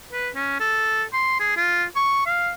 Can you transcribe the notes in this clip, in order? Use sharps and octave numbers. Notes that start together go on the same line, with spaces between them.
B4
C#4
A4
C6
G#4
F4
C#6
F5